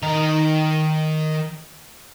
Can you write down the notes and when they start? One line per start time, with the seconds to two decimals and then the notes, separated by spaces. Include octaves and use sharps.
0.03 D#3 A#5